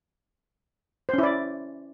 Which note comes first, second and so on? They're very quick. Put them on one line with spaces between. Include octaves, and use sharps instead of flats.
C5 C#4 E4 D5